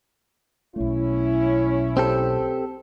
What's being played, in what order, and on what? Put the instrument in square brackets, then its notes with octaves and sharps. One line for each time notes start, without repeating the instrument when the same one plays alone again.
[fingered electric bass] B1 A3 [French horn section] C#4 E4
[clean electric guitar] C4 G4 A4